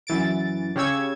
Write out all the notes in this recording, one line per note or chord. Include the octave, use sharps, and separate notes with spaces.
F#2 E3 A6 D7
C#3 G4 C#5 E6 G#6